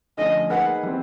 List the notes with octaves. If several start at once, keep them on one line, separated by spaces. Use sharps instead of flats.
D3 F3 A3 C#4 D#5
A#3 D#4 G#4 B4 F#5
E3 G3 C4